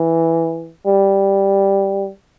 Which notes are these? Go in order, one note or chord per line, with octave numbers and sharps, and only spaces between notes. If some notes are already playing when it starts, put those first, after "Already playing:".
Already playing: E3
G3